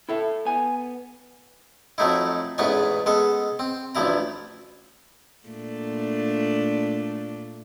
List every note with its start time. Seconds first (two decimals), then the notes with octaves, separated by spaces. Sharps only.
0.09 E4 A4 E5
0.45 B3 G#5
1.98 F2 F#3 A3 D#4 E4
2.58 A1 E2 G#2 B3 C#4 G#5
3.06 G#3 B3 A4
3.59 C4
3.95 A1 D2 F3 E4 A#5
5.47 A#2 A3 D4